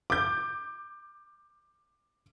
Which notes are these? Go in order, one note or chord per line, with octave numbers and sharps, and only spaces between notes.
D6 G6